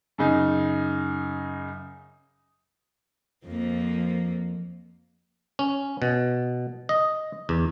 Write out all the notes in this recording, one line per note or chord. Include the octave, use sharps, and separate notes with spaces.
F#2 C#3 D#4
F2 F3 A#3
C#4
B2
D#5
E2